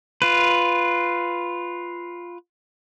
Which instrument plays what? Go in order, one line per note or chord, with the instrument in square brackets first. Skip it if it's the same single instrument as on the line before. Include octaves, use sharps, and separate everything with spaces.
[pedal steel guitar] F4 B4